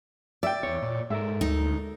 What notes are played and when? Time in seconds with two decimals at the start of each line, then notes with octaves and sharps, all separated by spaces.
0.43 D5 E5 G5
0.63 E2 C#5
0.82 A#2
1.10 G#2 G#3 A4 A#4 E5
1.41 D2 D#4